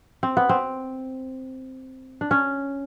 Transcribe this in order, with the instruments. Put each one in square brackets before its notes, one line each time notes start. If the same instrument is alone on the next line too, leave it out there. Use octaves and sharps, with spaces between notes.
[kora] C4
B3
C4
D4
C#4